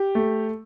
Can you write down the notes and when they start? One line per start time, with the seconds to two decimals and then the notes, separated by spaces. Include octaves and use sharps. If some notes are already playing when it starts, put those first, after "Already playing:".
Already playing: G4
0.15 A3